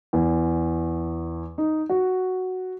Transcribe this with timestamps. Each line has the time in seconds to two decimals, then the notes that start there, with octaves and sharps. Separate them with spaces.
0.13 E2
1.58 D#4
1.90 F#4